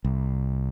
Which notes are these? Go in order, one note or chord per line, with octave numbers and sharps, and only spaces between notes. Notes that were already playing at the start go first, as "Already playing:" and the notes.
C2